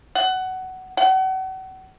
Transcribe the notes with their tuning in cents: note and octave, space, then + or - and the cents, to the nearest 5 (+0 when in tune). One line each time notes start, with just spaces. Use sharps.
F#5 +15
F#5 +35